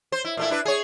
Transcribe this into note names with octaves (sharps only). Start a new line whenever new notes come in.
C5
E4
A#2 A3 E4
D4 E4 B4
G#4 C#5